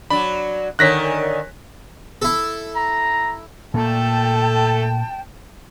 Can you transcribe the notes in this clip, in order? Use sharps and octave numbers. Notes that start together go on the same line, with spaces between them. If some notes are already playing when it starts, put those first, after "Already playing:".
F#3 D4 B5
D3 D#3 A#4 C#5 G#5 F#6 A#6 B6
E4 A4
A#5
A#2 A3 A#3 A4 G5 A5